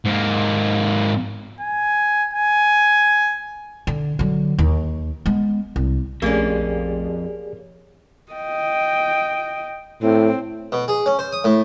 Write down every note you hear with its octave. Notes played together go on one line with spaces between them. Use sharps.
G#2 A#3
G#5
G#5
D3
D3 F#3
D#2
G#3 B3
C2
A#1 F2 A3 A#3 C#4 G4 G#4 D5
D#5 G5
A2 C4
B2
G#4
C#4
C5
D#6
A2